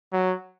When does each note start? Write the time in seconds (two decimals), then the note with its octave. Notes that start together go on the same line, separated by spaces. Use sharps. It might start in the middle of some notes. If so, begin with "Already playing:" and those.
0.13 F#3